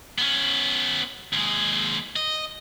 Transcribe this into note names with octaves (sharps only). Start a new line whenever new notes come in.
B3 C#4
D#2 G#3
D#5